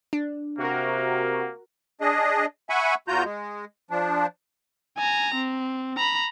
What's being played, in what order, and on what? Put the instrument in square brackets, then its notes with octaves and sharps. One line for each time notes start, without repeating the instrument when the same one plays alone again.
[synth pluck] D4
[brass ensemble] C3 [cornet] A#3 [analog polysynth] F#4 A#4
[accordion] D4 G#4 D#5
E5 F#5 G#5 B5 C#6
E2 F4 F#4 A#5 G6
G#3
F3 D4
[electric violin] G#5 A#5
C4
A#5 B5